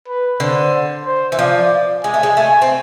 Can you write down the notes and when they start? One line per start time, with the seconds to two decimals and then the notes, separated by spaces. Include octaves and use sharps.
0.08 B4
0.40 D3 C5
1.06 C5
1.32 E3
1.39 F3 D5
2.04 G#3 G#5
2.14 A3
2.23 G#3
2.37 A3 G#5
2.62 C4